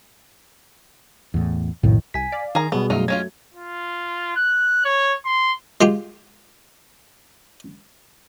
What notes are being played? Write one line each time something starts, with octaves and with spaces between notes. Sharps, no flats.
E2 A2
B1 F2 A2 D#3
C2 G#5 B6
D5 F5
D#3 G#4 A#5
B2 F#3 G3 B3 G#4
F#2 F#3 A3 D#4 F4
G#3 C#4 F4 G#6
F4
F#6
C#5
C6
G#3 F4 G4